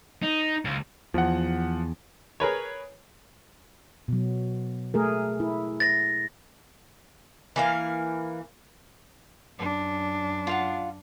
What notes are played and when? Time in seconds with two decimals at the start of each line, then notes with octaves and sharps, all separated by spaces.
0.22 D#4
0.65 C#2
1.14 E2 F3 F#5
2.40 G#4 A#4 B4 C#5
4.08 B2 F#3
4.94 A3 G#4 A#4
5.40 E4
5.80 A6 A#6
7.56 E3 A#3 F5
9.58 F#2 D4
10.47 F4 F5 F#5